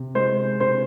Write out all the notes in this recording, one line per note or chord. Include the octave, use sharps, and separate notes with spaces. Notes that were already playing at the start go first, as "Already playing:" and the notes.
Already playing: C3
G#3 C5
C3 C5